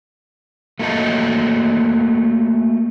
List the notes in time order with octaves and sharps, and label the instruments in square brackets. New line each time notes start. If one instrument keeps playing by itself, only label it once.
[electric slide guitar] A3 A#3 F#4 A4 D#5 A5